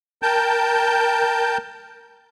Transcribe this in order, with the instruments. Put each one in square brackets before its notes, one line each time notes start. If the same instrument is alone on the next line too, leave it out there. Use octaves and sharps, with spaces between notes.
[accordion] A#4 G5 A5 G6